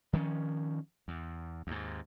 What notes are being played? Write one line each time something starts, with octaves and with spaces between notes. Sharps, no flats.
D#3 F3 G#3 C#4
E2
D#2 G#2